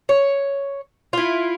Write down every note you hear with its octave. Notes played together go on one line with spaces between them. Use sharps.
C#5
E4 F4